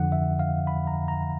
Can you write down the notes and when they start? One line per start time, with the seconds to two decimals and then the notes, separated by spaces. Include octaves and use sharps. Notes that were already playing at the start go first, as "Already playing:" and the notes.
Already playing: F2 D3 F3 F#5
0.12 E5
0.39 F5
0.67 B5
0.87 A#5
1.08 A#5